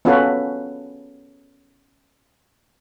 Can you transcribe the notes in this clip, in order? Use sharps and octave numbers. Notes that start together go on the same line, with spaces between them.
B3 C#4 F4 F#4 A4 B4